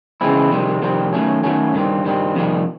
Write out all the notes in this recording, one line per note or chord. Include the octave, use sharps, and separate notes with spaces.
C#3 E3 G#3 C4 E4
F2 C3 D#3 G3 C4
F2 C3 D#3 G3 C4
D#3 F#3 A3 C#4
D#3 F#3 A3 C#4
G2 D#3 G3 C4
G2 D#3 G3 C4
F2 C3 D#3 G3